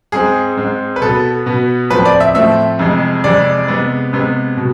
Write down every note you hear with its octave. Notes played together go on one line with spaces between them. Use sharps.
G#2 G#3 C4 G#4
G#2 G#3 C4
B4
B2 B3 A4
B2 B3
A2 F3 A3 C4 B4
D5
E5
A2 F3 A3 C4 E5
F2 C3 E3 G#3
F2 C3 E3 G#3 D5
C3 G#3 B3
C3 G#3 B3
B2